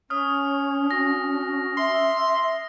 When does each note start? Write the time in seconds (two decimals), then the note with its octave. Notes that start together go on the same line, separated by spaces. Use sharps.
0.10 C#4 C#5 D#6 F6
0.91 F#4 A#6
1.77 E5 C6